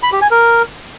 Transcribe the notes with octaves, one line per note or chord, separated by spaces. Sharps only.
B5
G4
G#5
A#4